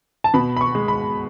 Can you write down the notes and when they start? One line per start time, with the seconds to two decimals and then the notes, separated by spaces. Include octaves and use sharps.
0.24 A5
0.34 B2 B5
0.57 B5
0.61 C#6
0.75 G#3
0.88 B5